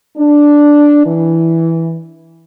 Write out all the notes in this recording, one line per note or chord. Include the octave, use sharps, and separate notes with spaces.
D4
E3